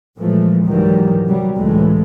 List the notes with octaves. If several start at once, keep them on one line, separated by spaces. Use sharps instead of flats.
A#2 E3 F3 G#3 A3
C2 G#2 D#3 E3 F#3 G3
C3 F#3 G3
C#2 A2 E3 G#3 A3